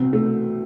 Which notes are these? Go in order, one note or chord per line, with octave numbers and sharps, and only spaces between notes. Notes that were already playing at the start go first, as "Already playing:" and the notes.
Already playing: C2 B2 C4
A3